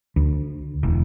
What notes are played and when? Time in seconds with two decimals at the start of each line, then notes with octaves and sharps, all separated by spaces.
0.16 D2
0.83 E1